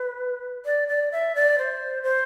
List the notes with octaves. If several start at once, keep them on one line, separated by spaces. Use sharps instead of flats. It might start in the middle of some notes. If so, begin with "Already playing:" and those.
Already playing: B4
D5
D5
E5
D5
C5
C5